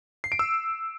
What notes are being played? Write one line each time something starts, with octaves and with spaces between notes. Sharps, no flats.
C7
D7
E6